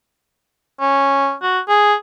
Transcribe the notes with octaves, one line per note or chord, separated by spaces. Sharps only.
C#4
F#4
G#4